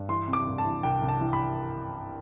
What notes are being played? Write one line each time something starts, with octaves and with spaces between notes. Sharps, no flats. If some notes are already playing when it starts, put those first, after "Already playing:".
Already playing: G2
E3 C6
C3
D6
C2
A5
E3
C2 G5
C2
A5
E3
B5